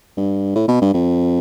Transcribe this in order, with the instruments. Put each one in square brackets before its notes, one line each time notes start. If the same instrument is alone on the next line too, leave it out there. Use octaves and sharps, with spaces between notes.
[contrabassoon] G2
A2
B2
G2
F2